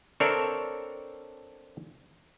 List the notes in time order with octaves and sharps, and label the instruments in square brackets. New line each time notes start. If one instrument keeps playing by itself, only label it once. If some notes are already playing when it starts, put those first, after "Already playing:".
[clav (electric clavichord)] C4 D4 A4 A#4 C#5 E5